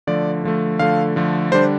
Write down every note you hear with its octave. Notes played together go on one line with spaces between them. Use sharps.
D3 F3 A3 D5
D3 F3 A3
D3 F3 A3 F5
D3 F3 A3
D3 G3 D4 C5